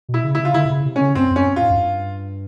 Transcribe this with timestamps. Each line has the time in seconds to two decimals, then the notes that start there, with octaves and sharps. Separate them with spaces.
0.09 B2
0.14 E4
0.24 C#3
0.35 C#3 E4
0.45 F4
0.54 D3 E4
0.65 C3
0.70 C#3
0.85 C3
0.96 C#3 C#4
1.15 G2 C4
1.31 F#2
1.36 C#4
1.46 G2
1.56 F4
1.62 G#2
1.70 F#2
1.76 G2